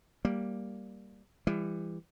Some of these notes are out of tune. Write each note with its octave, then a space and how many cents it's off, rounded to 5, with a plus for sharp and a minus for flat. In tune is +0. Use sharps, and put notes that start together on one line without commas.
G3 +0 A#3 +0
E3 +25 G3 +40